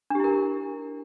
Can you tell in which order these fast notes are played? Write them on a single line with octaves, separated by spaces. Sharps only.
D4 G4 E4 A#4